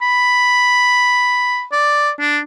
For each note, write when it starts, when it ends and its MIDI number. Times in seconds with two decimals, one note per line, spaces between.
0.02 1.64 83
1.72 2.10 74
2.19 2.40 62